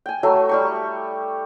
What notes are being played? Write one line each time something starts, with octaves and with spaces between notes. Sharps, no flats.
G5 G#5
F#3 A3 A4 E5
G3 G4 C#6